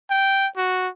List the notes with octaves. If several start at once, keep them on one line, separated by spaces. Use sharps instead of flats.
G5
F#4